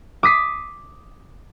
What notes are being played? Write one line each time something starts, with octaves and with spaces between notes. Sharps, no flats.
D6 D#6 B6 C7